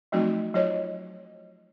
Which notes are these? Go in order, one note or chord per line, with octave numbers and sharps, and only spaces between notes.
F3 F#3 A3 C4 D#4 F#4
F#3 F4 C5 C#5 D#5